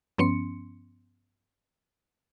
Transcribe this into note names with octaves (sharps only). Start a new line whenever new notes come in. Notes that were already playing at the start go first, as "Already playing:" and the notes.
G2 F3 B3 C#4 C6 C#7